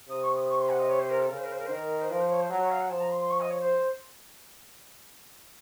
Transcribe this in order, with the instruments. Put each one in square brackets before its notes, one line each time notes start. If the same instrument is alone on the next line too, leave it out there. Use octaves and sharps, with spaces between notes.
[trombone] C3 [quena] D#6
[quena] C#6
D#6
C#6
C6
F#5
D#5
C#5
C5
A#4
A4
[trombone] C#3 [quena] A#4
[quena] C5
A#4
C5
A#4
C5
[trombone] D#3 [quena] A#4
[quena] C5
[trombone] F3 [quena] A#4
[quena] C5
C#5
C5
[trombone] F#3
[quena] C#5
F5
F#5
[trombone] F3 [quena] A5
[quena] A#5
C6
C6
C#6
D#5
C#5
C5